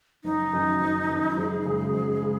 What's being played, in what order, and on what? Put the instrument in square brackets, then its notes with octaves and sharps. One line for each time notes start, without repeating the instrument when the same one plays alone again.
[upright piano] F#1 [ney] D#4
[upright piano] F#2 D#3
F#1
F#2 D#3
[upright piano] F#1 [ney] G#4
[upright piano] F#2 C#3 G#3
F#1
C#3 G#3